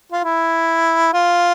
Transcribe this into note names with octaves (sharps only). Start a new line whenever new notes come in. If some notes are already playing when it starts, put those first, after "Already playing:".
F4
E4
F4